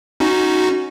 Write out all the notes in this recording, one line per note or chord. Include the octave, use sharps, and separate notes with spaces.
C#4 D#4 F#4